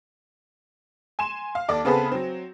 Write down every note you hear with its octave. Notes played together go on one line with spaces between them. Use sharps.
G#5 C6 E7
F5
D#2 A4 D5 D6
C#3 B3 C4 G#4 A4 B4
F#3 C4